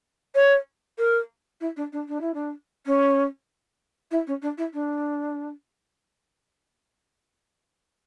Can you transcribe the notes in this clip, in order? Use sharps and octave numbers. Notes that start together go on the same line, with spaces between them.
C#5
A#4
E4
D4
D4
D4
E4
D4
C#4
E4
C#4
D4
E4
D4